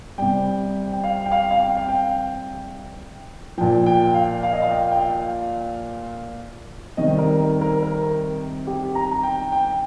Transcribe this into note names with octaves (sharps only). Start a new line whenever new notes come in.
C3 G3 G5
G5
F5
G5
F5
F5
G5
F5
G5
A#2 F3 G5
G5
F5
F5
D#5
F5
G5
G5
F5
C3 D#3 G3 D#5
A#4
A#4
A#4
A#4
G4
A#5
A#5
G5
G5